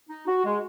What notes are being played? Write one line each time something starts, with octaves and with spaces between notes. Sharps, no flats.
D#4
F#4
G#3